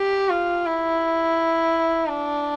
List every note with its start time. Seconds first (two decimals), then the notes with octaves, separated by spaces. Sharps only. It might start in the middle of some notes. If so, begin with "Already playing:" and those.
Already playing: G4
0.29 F4
0.66 E4
2.09 D4